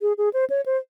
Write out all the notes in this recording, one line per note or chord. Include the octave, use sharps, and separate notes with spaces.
G#4
G#4
C5
C#5
C5